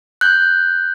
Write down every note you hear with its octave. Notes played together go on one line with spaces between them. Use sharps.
F#6 G6